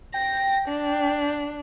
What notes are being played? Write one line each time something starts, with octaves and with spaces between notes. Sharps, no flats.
G5 A#6
D4